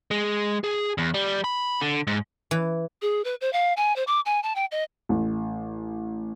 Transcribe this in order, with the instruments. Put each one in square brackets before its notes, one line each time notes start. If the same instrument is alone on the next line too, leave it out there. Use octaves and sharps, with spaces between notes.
[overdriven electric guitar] G#3
G#4
E2
G3
B5
D3
G#2
[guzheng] E3
[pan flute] G#4
B4
C5
F5
G#5
C5
D6
G#5
A5
G5
D#5
[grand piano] A1